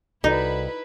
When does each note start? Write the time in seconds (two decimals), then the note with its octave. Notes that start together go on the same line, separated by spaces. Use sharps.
0.24 C2 D#4 E4 F#4 A4 B4 D5